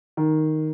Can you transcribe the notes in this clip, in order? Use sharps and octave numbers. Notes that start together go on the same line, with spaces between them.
D#3